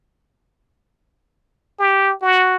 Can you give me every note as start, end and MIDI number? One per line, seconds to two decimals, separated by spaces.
1.80 2.14 67
2.22 2.56 66